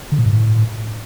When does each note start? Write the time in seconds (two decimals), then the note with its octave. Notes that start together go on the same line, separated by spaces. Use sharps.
0.12 D3
0.19 A#2
0.26 G#2
0.33 A2